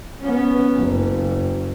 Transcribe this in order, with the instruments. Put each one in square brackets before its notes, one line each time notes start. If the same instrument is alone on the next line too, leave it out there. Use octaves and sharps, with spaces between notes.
[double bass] B3 C#4
F#1